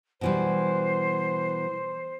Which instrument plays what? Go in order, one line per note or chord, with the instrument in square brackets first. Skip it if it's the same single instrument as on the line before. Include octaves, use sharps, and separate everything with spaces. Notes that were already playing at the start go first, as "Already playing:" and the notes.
[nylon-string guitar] B2 E3 G3 [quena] C5